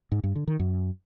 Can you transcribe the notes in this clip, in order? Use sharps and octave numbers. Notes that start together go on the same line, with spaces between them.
G#2
G2
D3
D#3
F#2